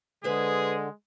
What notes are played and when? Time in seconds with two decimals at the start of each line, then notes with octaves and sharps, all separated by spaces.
0.24 D3 G#3 G#4 B4 C5